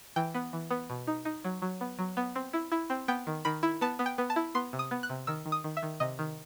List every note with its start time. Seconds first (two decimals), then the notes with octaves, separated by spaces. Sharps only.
0.16 E3 G5
0.34 B3
0.53 E3
0.71 B3
0.90 B2
1.07 D#4
1.25 D#4
1.44 F#3
1.62 F#3
1.81 B3
1.99 F#3
2.17 B3
2.36 C4
2.53 E4
2.72 E4
2.90 C4
3.08 B3 G5
3.27 D#3
3.45 D#3 B5
3.63 E4
3.81 B3 A5
3.99 B3
4.06 G5
4.18 B3
4.30 A5
4.36 E4
4.55 B3 C6
4.73 C3
4.79 D#6
4.91 B3
5.03 F#6
5.09 C3
5.27 D#3 E6
5.46 D#3
5.52 D#6
5.64 D#3
5.77 E5
5.83 D#3
6.00 C3 D#5
6.19 D#3